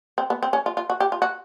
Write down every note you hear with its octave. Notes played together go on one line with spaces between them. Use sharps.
C4
B3
C4
C#4
F4
F4
F#4
G4
F4
F#4